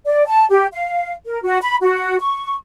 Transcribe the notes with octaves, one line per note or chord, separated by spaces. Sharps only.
D5
A5
G4
F5
A#4
F#4
B5
F#4
C#6